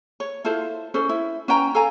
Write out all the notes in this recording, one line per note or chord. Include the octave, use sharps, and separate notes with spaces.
C#5
E4 F4 A4 C5
C#4 A4 C5
E4
C#4 B4 G5 A#5
A4 F5 G#5 A#5